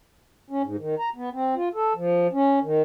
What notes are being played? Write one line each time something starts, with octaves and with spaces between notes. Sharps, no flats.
C#4
G#2
D#3
A#5
B3
C4
F4
A4
F3
C#4
D#3